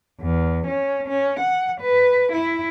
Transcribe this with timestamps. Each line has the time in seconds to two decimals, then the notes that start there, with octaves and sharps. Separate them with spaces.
0.21 E2
0.67 C#4
1.08 C#4
1.40 F#5
1.81 B4
2.33 E4